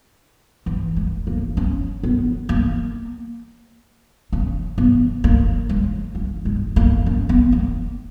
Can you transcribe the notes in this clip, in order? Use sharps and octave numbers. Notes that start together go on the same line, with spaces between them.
E3
G#3
A#3
C#4
B3
A#3
C#4
B3
A#3
G#3
G#3
G#3
A#3
C#4
B3
A#3